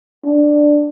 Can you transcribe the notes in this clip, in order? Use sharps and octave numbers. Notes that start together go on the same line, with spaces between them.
D4